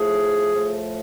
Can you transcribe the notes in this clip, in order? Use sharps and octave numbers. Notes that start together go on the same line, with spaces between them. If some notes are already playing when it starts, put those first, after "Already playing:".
Already playing: A2 F3 A3 G#4
A2 F3 A3